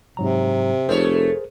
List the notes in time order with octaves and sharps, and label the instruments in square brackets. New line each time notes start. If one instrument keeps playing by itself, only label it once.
[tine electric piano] G#2 F#3 A#5 [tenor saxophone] C3
[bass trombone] F1 [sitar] A3 C#5 [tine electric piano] G#4 A#4 C5